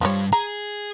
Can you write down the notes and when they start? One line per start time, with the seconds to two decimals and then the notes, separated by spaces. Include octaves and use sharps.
0.01 E2 G2 F3 G3 C#5
0.33 G#4 A#5